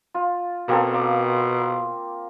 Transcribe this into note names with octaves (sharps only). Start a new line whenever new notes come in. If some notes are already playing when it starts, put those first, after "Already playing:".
F4
B2 A#3 C4 A4
A#5 D6